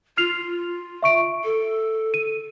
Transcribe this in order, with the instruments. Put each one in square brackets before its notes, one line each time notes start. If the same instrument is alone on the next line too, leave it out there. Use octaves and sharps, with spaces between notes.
[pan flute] F4 [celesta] F6 C7 F7
[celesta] E5 C#6 D7
[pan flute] A4
[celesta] D#7